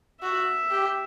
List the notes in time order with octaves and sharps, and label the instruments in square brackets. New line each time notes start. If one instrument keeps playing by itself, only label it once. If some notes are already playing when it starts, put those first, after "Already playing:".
[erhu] F#4 [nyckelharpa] E5
[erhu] G4